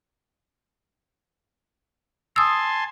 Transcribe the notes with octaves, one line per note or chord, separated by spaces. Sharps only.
G#5 A5 C6 D#6 E6